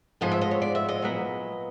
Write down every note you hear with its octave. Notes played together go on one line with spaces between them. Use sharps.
G#2 F3 G#3 B3 D#5
E5
D#5
C#5
D5
E5
D#5
A#2 F#3 B3